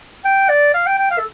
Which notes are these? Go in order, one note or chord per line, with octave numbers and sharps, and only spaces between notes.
G5
D5
F5
G5
G5
F5
A4